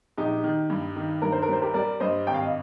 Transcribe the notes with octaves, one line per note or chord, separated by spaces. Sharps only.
A#1 D#4 G4
D#3
G2
D#3
G2 A#4
C5
A#4
G3 C5
G4 A#4
G3 A#4 D5
G2 C5 D#5
G#1 G5
F5
D#5